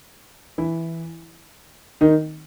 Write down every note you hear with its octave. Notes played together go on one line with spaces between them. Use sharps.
E3 E4
D#3 D#4